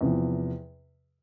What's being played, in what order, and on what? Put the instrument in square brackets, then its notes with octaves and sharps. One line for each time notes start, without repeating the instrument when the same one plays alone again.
[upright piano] E2 C3 F3